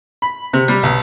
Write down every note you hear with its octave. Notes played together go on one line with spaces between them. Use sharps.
B5
C3
G3
B1